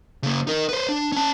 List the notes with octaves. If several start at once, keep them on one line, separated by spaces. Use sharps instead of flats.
C#3 A#3
D#4 A#4
B4 C5
D4
C#4 A5